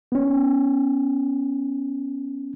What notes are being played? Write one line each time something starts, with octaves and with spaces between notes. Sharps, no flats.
B3 C#4